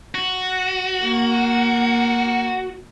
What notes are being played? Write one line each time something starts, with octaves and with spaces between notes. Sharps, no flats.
F#4
A#3